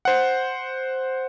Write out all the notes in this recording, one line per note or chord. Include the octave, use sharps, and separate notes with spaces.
C5 F#5